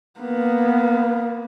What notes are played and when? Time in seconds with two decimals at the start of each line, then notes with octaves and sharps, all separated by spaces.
0.19 A#3 B3